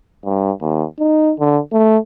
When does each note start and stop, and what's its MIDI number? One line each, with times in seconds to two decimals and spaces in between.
0.25 0.52 43
0.61 0.85 39
0.99 1.34 63
1.39 1.60 50
1.72 1.98 57